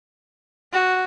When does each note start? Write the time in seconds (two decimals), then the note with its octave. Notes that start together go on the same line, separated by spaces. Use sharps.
0.73 F#4